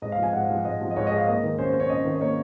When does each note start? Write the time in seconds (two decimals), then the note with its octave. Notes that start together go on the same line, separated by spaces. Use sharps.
0.02 G#2 D#5
0.12 F5
0.18 F3 G#5
0.33 G#2 F#5
0.44 F5
0.49 F3
0.65 G#2 D#5
0.81 F3
0.91 D#5
0.96 G#2 C#5
1.07 D#5
1.11 G#3
1.17 F5
1.27 A#3 D#5
1.43 D#3
1.58 C#4 C5
1.69 C5
1.74 C#4
1.80 C#5
1.90 C#4 D#5
2.05 D#3
2.15 D#5
2.21 A#3 C#5